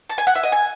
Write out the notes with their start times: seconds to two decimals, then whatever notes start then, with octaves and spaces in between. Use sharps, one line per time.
0.10 A5
0.18 G#5
0.27 F#5
0.35 E5
0.43 D#5
0.52 G#5